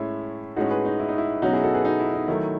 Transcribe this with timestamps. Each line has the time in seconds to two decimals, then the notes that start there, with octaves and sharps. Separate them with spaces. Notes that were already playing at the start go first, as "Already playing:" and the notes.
Already playing: A2 G#3 C#4 E4
0.56 A2 G#3 C#4 D#4 F#4
0.71 G#4 B4
0.85 D#4
1.00 E4
1.09 D#4
1.18 E4
1.42 B2 F#3 C#4 D#4 F#4
1.53 E4 G#4
1.64 F#4 A4
1.74 G#4 B4
1.85 D#4 F#4
2.00 E4
2.14 D#4
2.28 D#3 F#3 A3 E4